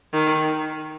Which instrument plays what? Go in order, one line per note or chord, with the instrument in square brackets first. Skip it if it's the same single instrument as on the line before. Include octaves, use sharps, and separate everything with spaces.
[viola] D#3